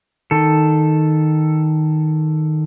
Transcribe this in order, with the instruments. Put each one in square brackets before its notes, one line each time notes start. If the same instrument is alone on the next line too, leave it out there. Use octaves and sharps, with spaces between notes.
[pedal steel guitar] D#3 A4